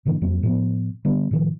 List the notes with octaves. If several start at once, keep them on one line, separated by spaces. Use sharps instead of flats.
G#2 D3 E3 A#3
F2 F#3 A#3 C4
A2 F3 B3
D3 G3 B3
A2 D#3 F3